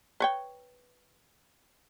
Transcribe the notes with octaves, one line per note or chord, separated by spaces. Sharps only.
B4 C#5 G5